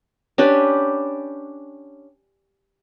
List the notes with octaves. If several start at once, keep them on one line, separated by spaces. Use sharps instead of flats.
C#4 D4 G4 B4